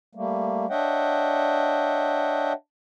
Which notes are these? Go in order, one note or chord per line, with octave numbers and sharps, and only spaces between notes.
G3 A3 A#3
D4 C#5 D#5 E5 F#5 G5